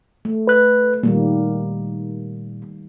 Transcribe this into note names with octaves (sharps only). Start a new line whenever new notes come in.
A3
B4 F#6
A#2 D#3 G3 A#3